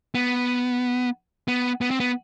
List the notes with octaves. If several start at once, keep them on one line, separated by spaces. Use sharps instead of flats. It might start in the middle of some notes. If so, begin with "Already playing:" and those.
B3
B3
B3
C4
B3